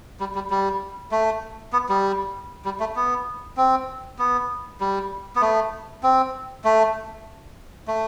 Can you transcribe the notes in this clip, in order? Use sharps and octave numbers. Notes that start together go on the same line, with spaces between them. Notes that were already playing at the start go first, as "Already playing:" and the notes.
G3
G3
G3
A3
B3
G3
G3
A3
B3
C4
B3
G3
B3
A3
C4
A3
A3